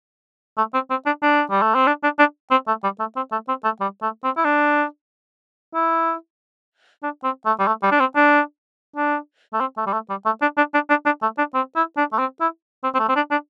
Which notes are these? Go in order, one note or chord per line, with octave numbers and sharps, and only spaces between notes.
A3
C4
C4
D4
D4
G3
A3
C4
D4
D4
D4
C4
A3
G3
A3
C4
A3
C4
A3
G3
A3
C4
E4
D4
E4
D4
C4
A3
G3
A3
G3
D4
C4
D4
D4
A3
C4
A3
G3
A3
G3
A3
D4
D4
D4
D4
D4
A3
D4
C4
E4
D4
A3
C4
E4
C4
C4
A3
C4
D4
D4